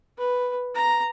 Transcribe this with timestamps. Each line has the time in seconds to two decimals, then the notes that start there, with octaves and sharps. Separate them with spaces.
0.18 B4
0.75 A#5